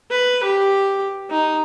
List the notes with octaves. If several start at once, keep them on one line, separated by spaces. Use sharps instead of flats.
B4
G4
D#4